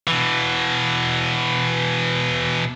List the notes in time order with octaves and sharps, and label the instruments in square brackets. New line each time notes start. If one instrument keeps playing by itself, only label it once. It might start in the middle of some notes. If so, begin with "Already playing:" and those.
[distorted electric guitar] B2 E3